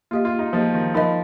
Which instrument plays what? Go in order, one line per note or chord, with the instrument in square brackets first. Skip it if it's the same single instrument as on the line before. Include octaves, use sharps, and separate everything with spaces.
[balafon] A#3 G4 D#5 [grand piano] F4
[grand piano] F4
D#4
[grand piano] F3 [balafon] A#3 G4 D#5
[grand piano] D#3
[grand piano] F3 [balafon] D#4 A#4 D#5